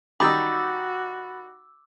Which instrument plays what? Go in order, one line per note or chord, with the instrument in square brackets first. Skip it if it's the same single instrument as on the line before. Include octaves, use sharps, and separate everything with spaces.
[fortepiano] D#3 G3 D#4 [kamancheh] F#4 [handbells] B5 A6 [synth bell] D6 E6